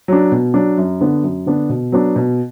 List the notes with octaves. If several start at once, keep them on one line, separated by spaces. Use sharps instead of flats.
F#3 D4
B2
F#3 D4
F#2
D3 B3 D4
F#2
D3 B3 D4
B2
F#3 B3 D4
B2